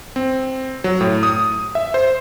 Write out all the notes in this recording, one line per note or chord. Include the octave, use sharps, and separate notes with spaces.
C4
F#3
A2
D#6
E5
C5